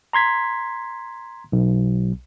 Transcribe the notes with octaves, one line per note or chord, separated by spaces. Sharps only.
A#5 C6 G#6 B6
B1